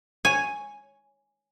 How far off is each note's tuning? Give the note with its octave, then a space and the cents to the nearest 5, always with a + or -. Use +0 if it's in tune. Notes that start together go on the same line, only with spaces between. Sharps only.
C#5 +0 G#5 +0